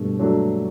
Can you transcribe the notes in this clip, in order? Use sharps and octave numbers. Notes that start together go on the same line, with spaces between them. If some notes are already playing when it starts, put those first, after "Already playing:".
Already playing: G2 B2 A3
F#3 A3 D4 A4